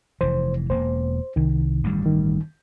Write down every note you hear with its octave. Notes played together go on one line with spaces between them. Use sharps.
F1 E3 C5
E1 A#3 C5
C2 D#3
A1 G2 G3
D#3